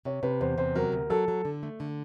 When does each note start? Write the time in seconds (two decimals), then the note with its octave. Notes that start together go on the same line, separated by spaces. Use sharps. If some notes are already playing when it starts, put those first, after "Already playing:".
0.05 C3 C#5
0.23 C3 B4
0.41 E2 C5
0.58 C3 C5
0.75 F#3 A#4
0.92 D2
1.10 F#3 A4
1.28 F#3
1.45 D3
1.63 A3
1.80 D3